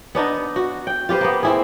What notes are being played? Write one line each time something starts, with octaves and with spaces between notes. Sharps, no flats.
B3 D4 D#4
F#4
G5
F4 G4 B4 C5
A#3 B3
C4 E4 G#4